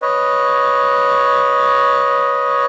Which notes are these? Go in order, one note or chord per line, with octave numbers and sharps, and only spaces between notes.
B4 C#5 D#5